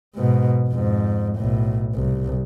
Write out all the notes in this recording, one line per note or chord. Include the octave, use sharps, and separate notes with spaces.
G#2 B2
F2 G#2
B1 A2
C2